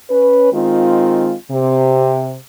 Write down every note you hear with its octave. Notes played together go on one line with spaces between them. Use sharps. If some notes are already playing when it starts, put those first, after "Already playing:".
C#4 B4
D#3 G#3 C4 F4
C3